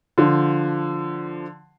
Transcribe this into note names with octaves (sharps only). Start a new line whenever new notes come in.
D3 F3